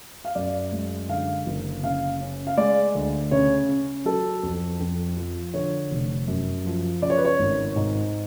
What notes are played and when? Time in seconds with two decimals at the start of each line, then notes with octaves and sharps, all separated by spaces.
0.25 F5
0.35 F#2 D5
0.72 G#3
1.09 D3 F5
1.46 F#1
1.83 C#3 F5
2.20 C#4
2.47 F5
2.57 G#3 D5
2.95 D2
3.31 C#3 C#5
3.69 C#4
4.05 F#3 A4
4.43 F2
4.80 F2
5.17 F3
5.54 D3 C#5
5.91 F1
6.28 F#2
6.65 F3
7.02 C#3 D5
7.10 C#5
7.17 B4
7.25 C#5
7.39 G#1
7.76 G#2